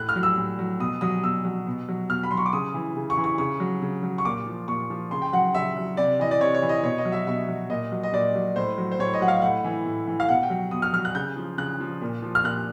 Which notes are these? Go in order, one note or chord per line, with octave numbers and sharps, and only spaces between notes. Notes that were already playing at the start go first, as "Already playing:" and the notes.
Already playing: A2 F#6
F6
F#3
E6
A2
F#3
B2 D#6
F#3 D#6
B2 E6
F#3
B2
F#3
B2 F6
B5
F#3 C6
C#6
D6
C#3 D#6
E3
C#3
C#6
E3
C#6
C#3 C#6
F#3
C#3
F#3
C#6
A#2 D6
F3
A#2 C#6
F3
C#3 C6
G5
F#3 F#5
C#3 E5
F#3
C3 D5
E3 D#5
D5
C3 C#5
C#5
E3
D#5
B2 C#5
D#5
F#3
E5
B2 E5
F#3
A#2 D#5
F#3
D#5
A#2 D5
F#3
A2 C5
F#3
C5
A2 C#5
D#5
F#3 F#5
F5
A2 F#5
E3
A2
E3
F5
B2 F#5
G5
F#3
B2 D#6
F6
F#3 F6
F#6
C#3 G6
F3
C#3 F#6
F3
A#2
F3
F6
A#2 F#6